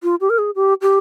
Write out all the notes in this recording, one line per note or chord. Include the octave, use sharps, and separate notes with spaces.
F4
G4
A#4
G#4
G4
G4